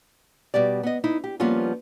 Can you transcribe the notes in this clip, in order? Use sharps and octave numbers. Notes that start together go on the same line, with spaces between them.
B2 G3 G4 D5
B3 D#5
D#4 E4
G4
F3 G3 A#3 B3 C#4 F4